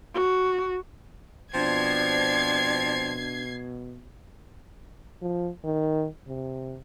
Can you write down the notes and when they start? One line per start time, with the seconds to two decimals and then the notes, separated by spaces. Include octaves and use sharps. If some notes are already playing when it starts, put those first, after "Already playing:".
0.14 F#4
1.54 B2 F3 C4 D4 G#6 C7
5.22 F3
5.64 D#3
6.28 C3